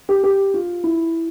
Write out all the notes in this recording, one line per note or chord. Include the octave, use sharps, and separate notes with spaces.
G4
G4
F4
E4